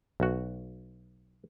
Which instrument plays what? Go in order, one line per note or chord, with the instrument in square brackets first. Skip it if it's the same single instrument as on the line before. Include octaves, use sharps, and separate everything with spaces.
[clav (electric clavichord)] B1 F#4